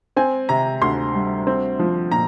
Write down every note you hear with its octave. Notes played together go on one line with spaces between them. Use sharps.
C4 G#5
C3 A#5
D2 C6
G3
C4
F3
A#2 A#5